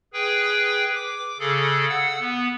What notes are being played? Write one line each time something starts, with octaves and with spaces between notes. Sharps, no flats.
G#4 B4 G5
D6
C#3 G#4 A4
F#5 E6
B3